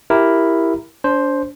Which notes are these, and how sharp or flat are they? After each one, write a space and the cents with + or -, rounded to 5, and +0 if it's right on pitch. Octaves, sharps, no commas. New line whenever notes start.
E4 +5 G4 +0 A#4 +0
D4 -35 C5 +5